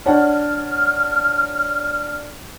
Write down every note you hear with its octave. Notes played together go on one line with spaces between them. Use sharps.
D4 C#5 F#5 F6